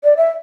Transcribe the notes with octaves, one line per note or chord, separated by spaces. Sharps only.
D5
E5